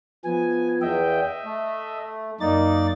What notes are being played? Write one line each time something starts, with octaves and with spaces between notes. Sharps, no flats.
F3 B3 G#5
E2 D#5 E5 G5
A3
F#2 A#3 D#4 D5 A6